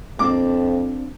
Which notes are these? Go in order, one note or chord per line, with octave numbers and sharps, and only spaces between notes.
F2 A#3 C4 D4 D6